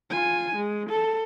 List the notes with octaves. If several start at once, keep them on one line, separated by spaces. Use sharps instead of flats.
F4 G#5
G#3
A4